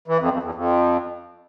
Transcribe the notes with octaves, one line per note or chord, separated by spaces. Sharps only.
E3
F2
F2
E2
F2